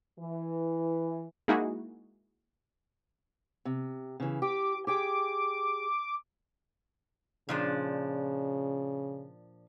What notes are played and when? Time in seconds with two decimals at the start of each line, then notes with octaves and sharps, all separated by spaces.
0.19 E3
1.48 G#3 A#3 D#4 E4 F#4 G#4
3.65 C3
4.20 C#3 E3
4.42 G4 D6
4.87 G4 G#4 G5 D6
7.49 A#2 C#3 F3 D4